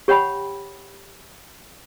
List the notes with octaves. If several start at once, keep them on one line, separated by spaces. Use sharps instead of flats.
G4 C#5 F#5 G5 B5